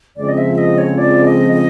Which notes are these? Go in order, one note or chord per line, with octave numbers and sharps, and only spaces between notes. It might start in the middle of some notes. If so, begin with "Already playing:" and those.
F2 C#3 F3 G#3 C4 D5
D#5
E5
D#5
C#5
D5
D#5
D#5